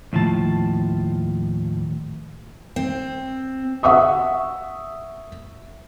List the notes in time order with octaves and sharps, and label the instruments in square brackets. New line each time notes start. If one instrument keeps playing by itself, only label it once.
[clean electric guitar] D#2 A2 F3 A5
[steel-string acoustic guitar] C4
[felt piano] E5 F#5 C#6 D#6